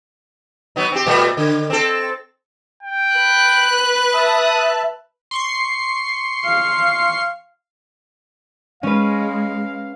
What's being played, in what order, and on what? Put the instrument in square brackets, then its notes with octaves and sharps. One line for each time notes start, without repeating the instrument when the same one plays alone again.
[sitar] F#3 B3 D#4
C4 G4
A#2 G3 A3
D3
C4 A4
[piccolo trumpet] G5
[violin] B4 F#6
[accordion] E5 A5 [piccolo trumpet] D#6
[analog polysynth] C6 C#6 C7
[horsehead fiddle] F5
[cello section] G#3 [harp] C#4 B4 [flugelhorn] F5